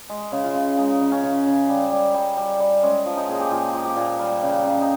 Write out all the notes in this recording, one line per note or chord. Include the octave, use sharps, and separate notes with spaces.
G#3
C#3
F4
C#3
G#3 D#4
C#3
C#4
C#3
C#3
G3
G3
G3
G3
G3
G#3 C#4
F3
D#4
A#2 G#4
G4
A#2 F4
F3
G4
A#2
G3 A#4
C#3
C#3
D#4